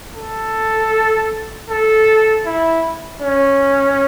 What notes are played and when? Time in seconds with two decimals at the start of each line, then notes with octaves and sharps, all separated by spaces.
0.14 A4
1.68 A4
2.46 E4
3.22 C#4